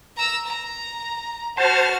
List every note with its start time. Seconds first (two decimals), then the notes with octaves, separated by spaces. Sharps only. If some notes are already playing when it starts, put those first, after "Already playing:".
0.17 A#5 E6
0.47 A#5
1.57 F#4 C5 A5 F6